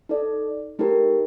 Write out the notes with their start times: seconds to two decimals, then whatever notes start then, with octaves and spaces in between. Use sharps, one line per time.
0.09 D#4 A4 D5
0.79 A3 D#4 G4 A#4